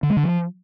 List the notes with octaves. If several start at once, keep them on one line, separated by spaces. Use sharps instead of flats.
D3
G#3
D3
F3